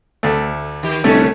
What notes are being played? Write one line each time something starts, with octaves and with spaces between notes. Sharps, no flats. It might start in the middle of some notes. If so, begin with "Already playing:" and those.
D2 A3
D#3 G4
C2 D3 A3 C#4